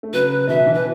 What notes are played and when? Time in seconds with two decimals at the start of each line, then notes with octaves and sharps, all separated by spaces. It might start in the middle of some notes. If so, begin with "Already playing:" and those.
0.03 A3
0.13 C#3 F#3 B4
0.48 B2 E3 E5
0.66 B2 E3
0.74 B4